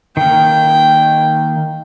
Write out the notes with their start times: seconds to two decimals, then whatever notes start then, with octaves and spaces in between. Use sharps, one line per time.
0.17 D#3 A#3 G5